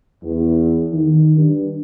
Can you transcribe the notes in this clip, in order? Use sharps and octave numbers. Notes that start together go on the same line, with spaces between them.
E2
D#3
G2